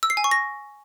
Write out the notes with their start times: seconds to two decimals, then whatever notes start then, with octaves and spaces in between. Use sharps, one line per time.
0.03 E6
0.10 C7
0.17 G#5
0.24 C#6
0.31 A#6